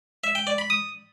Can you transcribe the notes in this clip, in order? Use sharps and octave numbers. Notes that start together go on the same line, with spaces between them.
E5
G5
D5
B5
D#6